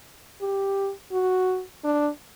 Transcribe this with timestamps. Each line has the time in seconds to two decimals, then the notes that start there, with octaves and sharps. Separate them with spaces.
0.41 G4
1.12 F#4
1.84 D4